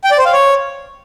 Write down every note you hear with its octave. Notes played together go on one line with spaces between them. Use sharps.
G5
D5
C5
F5
C#5